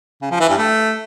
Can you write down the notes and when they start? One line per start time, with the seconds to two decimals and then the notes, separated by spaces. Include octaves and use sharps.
0.22 C#3
0.31 F3
0.40 E3
0.49 G2
0.58 A3